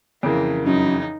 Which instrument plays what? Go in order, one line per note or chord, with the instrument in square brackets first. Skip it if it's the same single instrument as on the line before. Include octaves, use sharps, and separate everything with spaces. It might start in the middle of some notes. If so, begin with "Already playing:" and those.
[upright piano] F2 C#3 E3 [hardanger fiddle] A#3
[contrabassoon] F#2 [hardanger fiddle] D#4